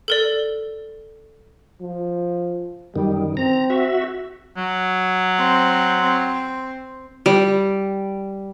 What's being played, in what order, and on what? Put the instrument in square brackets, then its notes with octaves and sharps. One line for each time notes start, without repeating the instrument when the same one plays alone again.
[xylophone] A4 A#4 D5
[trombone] F3
[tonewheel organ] F#2 D#3 [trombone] G3
[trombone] C4 [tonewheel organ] A#5
[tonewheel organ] F#4 E5
[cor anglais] F#3
[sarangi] C4
C4
[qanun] G3